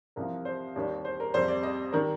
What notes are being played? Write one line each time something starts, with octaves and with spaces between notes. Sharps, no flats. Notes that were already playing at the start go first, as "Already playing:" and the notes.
C2 C3 F3 A#4
C5
D#2 D#3 G3
C5
A#4
F2 C3 G3 C5
D5
D#5
D#3 G3 A#4